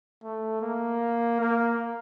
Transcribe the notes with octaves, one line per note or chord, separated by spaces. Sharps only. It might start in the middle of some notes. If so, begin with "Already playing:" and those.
A3
A#3
A#3